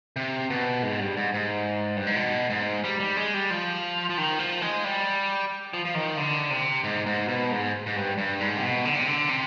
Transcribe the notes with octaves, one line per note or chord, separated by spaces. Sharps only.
C3
B2
G#2
G2
G#2
G#2
G2
G#2
B2
G#2
G3
G3
G#3
G3
F3
F3
D#3
F3
G#3
G3
F3
F3
D#3
D3
C3
G#2
G#2
B2
G#2
G#2
G2
G2
G#2
C3
B2
D3
C3
D3
C3